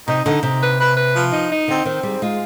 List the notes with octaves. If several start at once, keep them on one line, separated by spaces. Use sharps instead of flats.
C3 D#4
D3 D#4
C3 D#4
B4
B4
B4
F3
D#4
D#4
D3 C4
D#3 C4
G#2 G3
G#3 F4